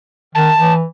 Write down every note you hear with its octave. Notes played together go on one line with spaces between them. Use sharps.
D#3 A5
E3